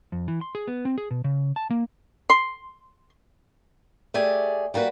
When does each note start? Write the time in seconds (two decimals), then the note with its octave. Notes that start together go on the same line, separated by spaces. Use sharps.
0.12 F2
0.28 E3
0.41 C6
0.55 G#4
0.68 B3
0.85 C4
0.98 G#4
1.11 B2
1.24 C#3
1.56 A5
1.70 A#3
2.30 C6
4.14 A3 G4 G#4 D5 G#5
4.74 G3 A#3 F#4 B4